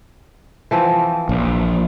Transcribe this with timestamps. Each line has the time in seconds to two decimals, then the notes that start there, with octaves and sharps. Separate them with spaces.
0.71 E3 F3 C4
1.29 A#1